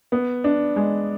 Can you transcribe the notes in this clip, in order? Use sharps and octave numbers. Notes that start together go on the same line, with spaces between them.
B3
D4
G#3